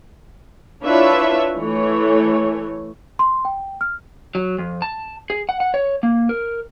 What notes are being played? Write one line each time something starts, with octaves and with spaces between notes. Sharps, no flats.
D4 E4 F4 B4 C#5 E5
E3 A3 C#5
C6
G5
F6
F#3
F2
A5
G#4
F#5
F#5
C#5
A#3
A#4